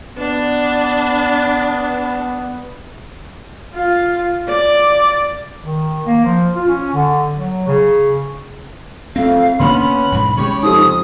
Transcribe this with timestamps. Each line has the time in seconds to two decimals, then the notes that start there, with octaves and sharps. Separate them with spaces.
0.18 B3 D4 B4
3.74 F4
4.49 D5
5.64 D#3
6.06 A#3
6.24 F3
6.55 F4
6.68 C#4
6.94 D3
7.34 F#3
7.67 C#3
9.16 F2 A3 C4 F5
9.60 D3 A#3 B3 C#4 D4 B5 C6
10.12 B1 G#2 E3
10.37 C#3 G#3 C#4 G4 C#5
10.63 F2 D#4 G4 D#6